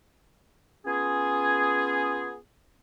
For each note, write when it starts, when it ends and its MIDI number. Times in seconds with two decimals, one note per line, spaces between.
0.86 2.37 59
0.86 2.37 61
0.86 2.37 65
0.86 2.37 68